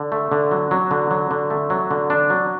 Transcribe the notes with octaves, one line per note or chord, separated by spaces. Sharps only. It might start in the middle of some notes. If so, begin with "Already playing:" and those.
Already playing: D3
A3
D3
F#3
F#3
D3
F#3
D3
A3
F#3
D3
D4
F#3